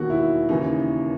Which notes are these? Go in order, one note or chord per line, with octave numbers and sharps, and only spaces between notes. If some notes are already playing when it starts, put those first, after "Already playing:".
Already playing: E1 D#2 D#3 F#4
E4
D#2 C#3 E3 D#4